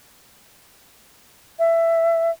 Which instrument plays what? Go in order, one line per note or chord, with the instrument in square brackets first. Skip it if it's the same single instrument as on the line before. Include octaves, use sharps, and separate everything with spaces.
[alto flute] E5